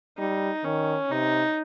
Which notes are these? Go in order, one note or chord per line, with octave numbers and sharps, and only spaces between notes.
G3 D#4
D#3 C#4
C3 D#4